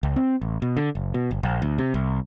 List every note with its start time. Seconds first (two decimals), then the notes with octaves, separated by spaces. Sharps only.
0.03 C#2
0.16 C4
0.41 A1
0.62 B2
0.77 D3
0.95 F#1
1.14 B2
1.31 G1
1.43 A#1
1.62 D2
1.78 C3
1.94 C2